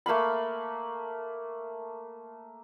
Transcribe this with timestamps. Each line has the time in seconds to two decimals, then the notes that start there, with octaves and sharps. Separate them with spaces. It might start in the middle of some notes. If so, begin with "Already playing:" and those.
0.06 A3 A#3 F5 B5